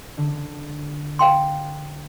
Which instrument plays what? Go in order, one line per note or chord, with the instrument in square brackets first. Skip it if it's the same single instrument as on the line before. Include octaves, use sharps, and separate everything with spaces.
[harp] D3
[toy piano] F5 G5 C6